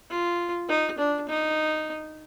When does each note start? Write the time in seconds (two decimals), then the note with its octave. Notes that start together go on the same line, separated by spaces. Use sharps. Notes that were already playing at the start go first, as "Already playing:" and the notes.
0.10 F4
0.69 D#4
0.98 D4
1.29 D#4